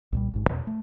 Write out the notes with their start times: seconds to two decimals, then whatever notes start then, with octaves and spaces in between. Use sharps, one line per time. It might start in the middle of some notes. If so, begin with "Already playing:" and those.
0.12 C2 A#2 G3
0.34 A1 G#2
0.48 E2 B2
0.67 A3